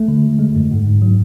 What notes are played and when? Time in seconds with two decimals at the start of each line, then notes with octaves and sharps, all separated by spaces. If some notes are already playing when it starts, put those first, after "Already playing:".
Already playing: A3
0.08 D3
0.24 G#3
0.39 G#3
0.56 F#2
0.71 G#2
0.87 G#2
1.02 F#3